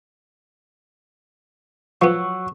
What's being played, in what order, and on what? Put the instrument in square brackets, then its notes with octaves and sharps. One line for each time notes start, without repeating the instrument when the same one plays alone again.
[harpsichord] F3 B3 [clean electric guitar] F#3 F#4 [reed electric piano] C#6 E6